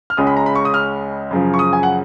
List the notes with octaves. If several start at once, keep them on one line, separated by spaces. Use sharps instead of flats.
F6
C#2 C#3 G#3 C#4 D#6
B5
A#5
B5
C#6
D#6
F6
F#2 C#3 F3
C#6
D#6
G#5
F#5